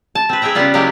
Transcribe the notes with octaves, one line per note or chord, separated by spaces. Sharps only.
A5
C4 B4
G#4 B4 E5 G5 A#5
C#3 G3 B3 F4
F#3 G#3 A#3 E4 F4 G4